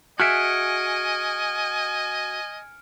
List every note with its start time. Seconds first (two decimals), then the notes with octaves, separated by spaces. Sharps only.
0.20 F#4 G#4 D#5 E5 G#5 F6 C#7 D7